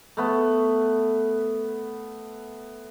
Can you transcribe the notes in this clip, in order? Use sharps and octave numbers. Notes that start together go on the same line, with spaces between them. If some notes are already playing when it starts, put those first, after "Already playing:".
A3 B3